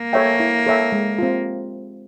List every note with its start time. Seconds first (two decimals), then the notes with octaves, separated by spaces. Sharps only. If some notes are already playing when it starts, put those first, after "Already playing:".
Already playing: A#3
0.13 A4 C#5 E5 G5
0.40 E4
0.66 A4 C#5 E5 G5
0.92 G#3
1.18 C4 F4